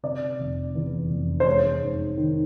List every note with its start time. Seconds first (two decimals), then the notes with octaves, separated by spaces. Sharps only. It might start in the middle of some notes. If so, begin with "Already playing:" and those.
0.03 C3 D5
0.40 F1
0.75 E2
1.10 F1
1.40 C5
1.46 G#3 C#5
1.82 G#2
2.17 D#3